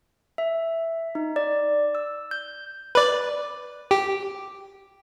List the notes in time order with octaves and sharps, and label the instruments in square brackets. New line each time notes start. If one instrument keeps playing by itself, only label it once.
[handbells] E5
D#4
D5
E6
G6
[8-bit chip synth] B4 D5
G4